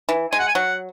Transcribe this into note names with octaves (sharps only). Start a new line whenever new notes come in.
E3
G#3 G#5
F#5
G#5
F#3 F#5